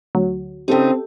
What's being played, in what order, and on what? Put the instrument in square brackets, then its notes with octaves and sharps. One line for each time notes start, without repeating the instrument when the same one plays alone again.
[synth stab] D2 F#3
[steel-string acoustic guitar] C#3 D#4 [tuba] C4 [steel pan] G4 A4 G5